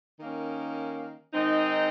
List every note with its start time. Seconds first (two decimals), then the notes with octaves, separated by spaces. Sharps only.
0.20 D#3 A#3 C#4
1.34 D#3 G#3 C4 D#4